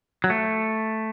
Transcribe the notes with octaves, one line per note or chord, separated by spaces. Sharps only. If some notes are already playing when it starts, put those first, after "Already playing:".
F#3
A3